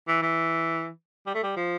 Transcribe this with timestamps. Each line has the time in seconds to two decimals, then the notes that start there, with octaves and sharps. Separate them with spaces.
0.08 E3
0.22 E3
1.27 G3
1.35 A3
1.43 G3
1.57 F3